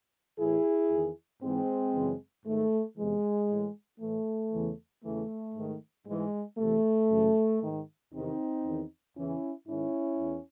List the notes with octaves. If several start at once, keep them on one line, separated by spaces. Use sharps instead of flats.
A2 E3 E4 G#4
E2 D#3
G#2 E3 G#3 C4
F#2 C#3 E3
G#2 D#3 A3
E2 C3 E3 G#3
A2 E3
A2 E3 A3
E2 C#3 E3
E2 C#3 E3 A3
G#2 D#3
G#2 E3 G#3
E2 C3 E3 A3
F#2 C#3 E3
G#2 D#3
E2 C3 D#3 C4 D#4
E2 D#3
E2 C#3 E3 C#4 E4
G#2 D#3 C#4 E4
E2